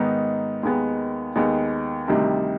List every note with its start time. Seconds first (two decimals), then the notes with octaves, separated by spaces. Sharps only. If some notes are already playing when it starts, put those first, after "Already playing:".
Already playing: G#2 D#3 B3 D#4
0.63 D#2 D#3 G#3 B3
1.36 D#2 D#3 G#3 B3
2.08 D2 C3 D#3 G3